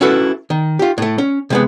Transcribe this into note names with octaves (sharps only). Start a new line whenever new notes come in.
C#4 E4 F#4 A4 B4
D#3
F4 G4
A2 A3
C#4
C3 G#3 B3